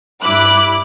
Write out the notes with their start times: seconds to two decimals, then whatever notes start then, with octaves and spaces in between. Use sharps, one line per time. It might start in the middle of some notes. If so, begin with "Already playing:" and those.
0.23 G2 E4 B5 D6 F#6